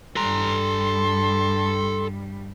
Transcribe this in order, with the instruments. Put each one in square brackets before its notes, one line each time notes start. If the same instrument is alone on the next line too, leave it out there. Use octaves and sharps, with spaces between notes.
[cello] G2 G3 [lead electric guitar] A4 A#5 [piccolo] C6